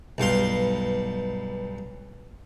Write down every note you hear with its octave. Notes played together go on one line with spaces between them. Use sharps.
B1 G2 F5 C6